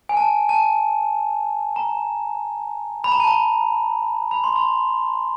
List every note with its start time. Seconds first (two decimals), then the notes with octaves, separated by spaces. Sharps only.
0.09 G#5
0.17 A5
0.49 A5
1.76 A#5
3.04 B5
3.12 A#5
3.20 A5
3.27 A#5
4.31 B5
4.44 C6
4.56 B5